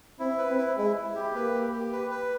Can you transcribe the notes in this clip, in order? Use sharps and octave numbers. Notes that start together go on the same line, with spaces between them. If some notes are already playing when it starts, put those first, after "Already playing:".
C4 E4
B4
C4
E4
G#3 E4
E4
G4
A#3 B4
G4
G4
B4
B4